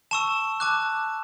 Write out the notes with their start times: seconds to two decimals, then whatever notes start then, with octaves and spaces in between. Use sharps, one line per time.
0.11 A5 C#6 E6 E7
0.60 A5 D6 F#6